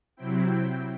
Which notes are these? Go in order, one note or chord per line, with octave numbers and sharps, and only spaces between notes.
C3 F#3 C4 E4 G5
G5